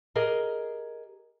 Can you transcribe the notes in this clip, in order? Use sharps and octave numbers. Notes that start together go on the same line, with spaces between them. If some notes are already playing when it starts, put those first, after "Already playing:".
G4 G#4 A#4 D#5